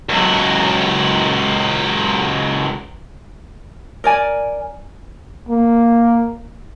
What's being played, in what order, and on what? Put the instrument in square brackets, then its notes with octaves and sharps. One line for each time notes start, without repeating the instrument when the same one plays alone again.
[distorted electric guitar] C#2 F#3
[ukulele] A#4 D5 G#5
[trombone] A#3